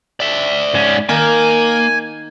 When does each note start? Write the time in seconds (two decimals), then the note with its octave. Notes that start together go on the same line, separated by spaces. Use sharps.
0.20 D5 E5
0.74 G#2 C#4
1.09 D#3 A#3 G#5